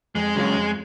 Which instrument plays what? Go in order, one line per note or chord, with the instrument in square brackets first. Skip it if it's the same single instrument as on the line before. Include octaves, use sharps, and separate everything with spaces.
[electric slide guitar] F2 [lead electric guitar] G#3
[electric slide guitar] C#3 F#3 C#4 F4
F2